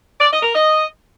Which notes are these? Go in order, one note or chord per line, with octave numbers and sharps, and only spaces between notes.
D5
D#5
A#4
D#5